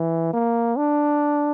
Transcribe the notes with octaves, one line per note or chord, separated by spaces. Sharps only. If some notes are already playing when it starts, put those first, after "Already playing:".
Already playing: E3
A#3
D4